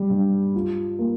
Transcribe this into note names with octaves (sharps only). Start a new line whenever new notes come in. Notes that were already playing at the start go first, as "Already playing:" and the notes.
Already playing: G3
G2
F4
A#3